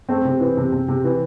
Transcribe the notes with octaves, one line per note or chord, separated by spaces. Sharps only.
A3 C4
C3
E3
C3
C3
C3
E3